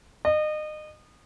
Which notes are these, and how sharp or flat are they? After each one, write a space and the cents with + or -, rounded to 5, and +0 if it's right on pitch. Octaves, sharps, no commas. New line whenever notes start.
D#5 -30